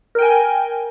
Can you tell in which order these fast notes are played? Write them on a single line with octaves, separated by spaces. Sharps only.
A#4 G5 G#5